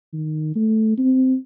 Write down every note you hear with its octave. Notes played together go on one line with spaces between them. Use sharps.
D#3
A3
C4